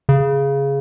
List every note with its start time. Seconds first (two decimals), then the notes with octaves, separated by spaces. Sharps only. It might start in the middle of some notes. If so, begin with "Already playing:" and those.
0.09 C#3